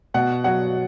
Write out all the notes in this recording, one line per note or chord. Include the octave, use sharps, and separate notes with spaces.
B2 F#5
F#3 F#5